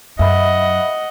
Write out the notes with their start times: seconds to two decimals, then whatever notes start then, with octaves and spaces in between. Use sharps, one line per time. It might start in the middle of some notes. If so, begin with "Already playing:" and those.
0.19 F#2 D#5 E5 F#5 B5